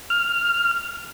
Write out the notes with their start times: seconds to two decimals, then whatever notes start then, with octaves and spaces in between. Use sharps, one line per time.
0.10 F6